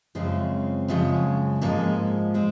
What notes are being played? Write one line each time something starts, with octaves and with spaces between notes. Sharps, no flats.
F#2 C#3 F3 G#3 C4
F#2 C#3 F3 G#3
G#2 F3 G#3 A#3
G#3 C4